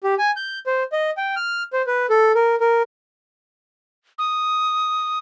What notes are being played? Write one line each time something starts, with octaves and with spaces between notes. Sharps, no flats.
G4
G#5
G6
C5
D#5
G5
F6
C5
B4
A4
A#4
A#4
D#6